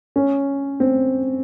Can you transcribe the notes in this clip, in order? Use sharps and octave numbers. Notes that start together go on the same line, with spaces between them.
C#4
C4